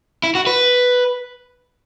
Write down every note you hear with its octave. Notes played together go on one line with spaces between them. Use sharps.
E4
F#4
B4